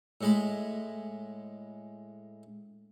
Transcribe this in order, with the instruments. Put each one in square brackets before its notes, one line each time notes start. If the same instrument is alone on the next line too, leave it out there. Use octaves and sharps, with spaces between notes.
[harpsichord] A2 G#3 B5